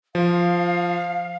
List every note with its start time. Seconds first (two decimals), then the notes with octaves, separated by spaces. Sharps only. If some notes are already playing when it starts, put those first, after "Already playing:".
0.15 F3 F5